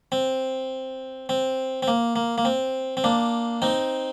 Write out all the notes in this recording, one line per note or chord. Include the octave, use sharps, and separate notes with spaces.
C4
C4
C4
A#3
A#3
A#3
C4
C4
A#3 D4
C4 D#4